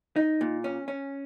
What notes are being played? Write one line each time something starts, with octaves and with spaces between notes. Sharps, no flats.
D#4
A#2
C#4
C#4